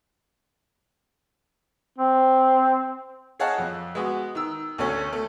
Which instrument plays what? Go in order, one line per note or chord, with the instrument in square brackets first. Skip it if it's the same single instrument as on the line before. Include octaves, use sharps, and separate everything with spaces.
[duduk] C4
[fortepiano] G#4 C#5 D#5 F5 F#5 A5
F2
G#3 B3 F#4
D#3 E6
D2 A3 C#4
A3